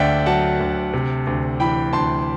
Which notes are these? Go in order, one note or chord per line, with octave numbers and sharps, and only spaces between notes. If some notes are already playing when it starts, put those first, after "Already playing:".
Already playing: D2 D3 D5 E5 F#5 G5
F#3 F#5 A5
D2
C3
D2
E3 G5 B5
D2 A5 C6